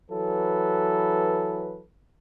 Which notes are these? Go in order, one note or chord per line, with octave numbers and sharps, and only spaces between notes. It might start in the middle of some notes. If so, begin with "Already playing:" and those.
E3 F#3 A4 B4